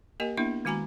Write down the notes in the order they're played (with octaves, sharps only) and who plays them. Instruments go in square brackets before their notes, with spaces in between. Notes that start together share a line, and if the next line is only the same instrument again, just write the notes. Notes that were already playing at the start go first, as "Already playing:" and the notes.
[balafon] A#3 G4 A#4 D#5 G#5
A#3 B3 D4 E4 E5
D#3 G#3 F#4 G#5 A#5 B5